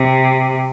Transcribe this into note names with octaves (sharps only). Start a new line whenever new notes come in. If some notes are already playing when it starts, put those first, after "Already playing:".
Already playing: C3